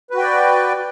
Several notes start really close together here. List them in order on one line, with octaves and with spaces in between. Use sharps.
B4 F#4 G5 D5